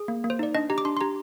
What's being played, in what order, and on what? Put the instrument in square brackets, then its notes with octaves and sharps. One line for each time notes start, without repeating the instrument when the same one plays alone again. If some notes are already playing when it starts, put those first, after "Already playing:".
Already playing: [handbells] G#4
A#3
A#3
C5
D#4 D5
D4 D#5
G4 A#5
D6
D4 C6
C6
G4 A#5